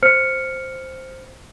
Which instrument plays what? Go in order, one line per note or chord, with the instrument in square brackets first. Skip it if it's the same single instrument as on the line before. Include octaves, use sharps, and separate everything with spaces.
[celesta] C5 F6 C#7